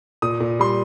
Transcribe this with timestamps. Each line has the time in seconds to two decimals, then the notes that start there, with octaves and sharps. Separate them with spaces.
0.22 A#2 D#6
0.40 A#2
0.59 G3 C6